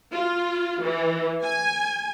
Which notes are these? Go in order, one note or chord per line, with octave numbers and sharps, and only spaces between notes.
F4
E3
G#5